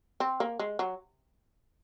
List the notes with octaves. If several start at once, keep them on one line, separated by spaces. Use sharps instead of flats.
C4
A#3
G#3
F#3